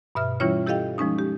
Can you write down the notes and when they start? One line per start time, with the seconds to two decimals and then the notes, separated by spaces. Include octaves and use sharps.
0.15 G2 B2 E5 F6
0.40 E3 G3 C#4 E4 F4 C#5
0.66 E4 G4 A4 D#5 F5 G5
0.98 F3 G#3 C#4 D#4
1.18 G4